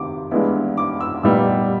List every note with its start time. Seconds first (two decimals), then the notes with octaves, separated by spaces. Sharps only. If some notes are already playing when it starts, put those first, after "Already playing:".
Already playing: C3 D#3 D6
0.31 G2 E3 G#3 B3 E4
0.77 D6
1.01 E6
1.23 A#2 G3 B3 D#4 E6